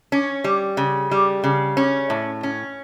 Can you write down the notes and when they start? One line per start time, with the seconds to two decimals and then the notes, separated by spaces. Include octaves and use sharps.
0.12 C#4
0.44 G3
0.77 C#3
1.11 G3
1.44 C#3
1.77 C#4
2.10 A2
2.43 C#4